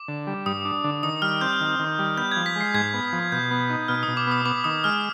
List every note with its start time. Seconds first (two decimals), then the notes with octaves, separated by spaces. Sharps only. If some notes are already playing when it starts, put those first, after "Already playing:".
Already playing: D6
0.08 D3
0.27 G3
0.46 G2 D#6
0.65 D4
0.84 D3
1.03 D#3 D#6
1.22 G3 F6
1.41 C4 G6
1.60 D#3
1.79 D#3
1.99 G3
2.17 B3 G6
2.32 F3 G#6
2.46 B6
2.56 G#3
2.61 C7
2.74 G#2 G#6
2.94 B3
3.13 F3
3.32 B2 G6
3.51 B3
3.70 D#4
3.88 B2 F6
4.03 D#6
4.08 B2
4.17 D6
4.27 B3 D#6
4.46 B3 D6
4.64 D#3 D#6
4.84 G#3 F6